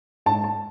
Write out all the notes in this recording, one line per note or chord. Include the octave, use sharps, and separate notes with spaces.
G#2 A5
A5